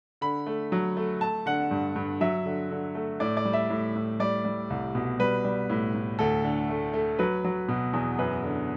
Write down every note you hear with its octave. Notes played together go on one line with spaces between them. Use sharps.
D3 B5
A3
F#3
A3
A3 A5
D3 F#5
G2
G2
F#3 E5
D3
D3
A3
A2 D5
D5
G3
E5
A2
A2
G3 D5
G3
C2
B2
G3 B4
G3
A2
A2
D2 A4
D3
A3
A3
F#3 B4
F#3
B2
E2
F#2 B4
D3